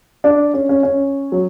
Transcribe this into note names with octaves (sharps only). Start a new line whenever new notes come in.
D4
C#4
C#4
C#4
F#3